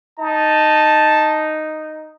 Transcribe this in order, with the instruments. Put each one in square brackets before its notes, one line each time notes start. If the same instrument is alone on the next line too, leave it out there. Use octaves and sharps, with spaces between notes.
[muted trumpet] D#4 [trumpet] A5